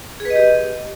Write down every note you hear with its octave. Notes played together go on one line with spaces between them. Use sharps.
G#4
B4
D#5
G4